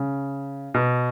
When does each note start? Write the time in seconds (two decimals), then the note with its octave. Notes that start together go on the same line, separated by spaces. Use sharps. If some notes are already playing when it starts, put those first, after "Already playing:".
Already playing: C#3
0.74 B2